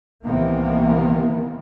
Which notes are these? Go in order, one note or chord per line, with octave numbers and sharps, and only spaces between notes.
C2 C3 D#3 E3 A#3 B3